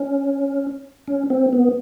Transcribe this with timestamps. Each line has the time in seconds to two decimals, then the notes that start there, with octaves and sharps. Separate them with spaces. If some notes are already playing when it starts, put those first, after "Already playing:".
Already playing: C#4
1.08 C#4
1.30 C4
1.53 B3